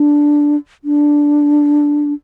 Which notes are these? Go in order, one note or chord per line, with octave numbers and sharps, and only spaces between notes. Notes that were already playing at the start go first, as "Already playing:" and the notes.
Already playing: D4
D4